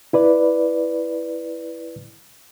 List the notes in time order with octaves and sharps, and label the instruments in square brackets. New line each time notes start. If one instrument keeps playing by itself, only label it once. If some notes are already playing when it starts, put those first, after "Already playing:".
[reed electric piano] E4 B4 D5